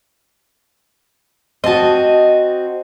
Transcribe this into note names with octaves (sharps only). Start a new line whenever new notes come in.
C4 F#4 D#5 A5